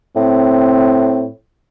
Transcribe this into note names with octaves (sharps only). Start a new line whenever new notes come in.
A2 C4